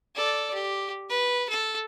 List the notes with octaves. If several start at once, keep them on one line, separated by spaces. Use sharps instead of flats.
A4 D5
G4
B4
A4